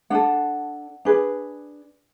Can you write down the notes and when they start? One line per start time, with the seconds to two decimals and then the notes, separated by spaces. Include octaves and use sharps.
0.10 D4 A4 F#5
1.05 D4 G#4 B4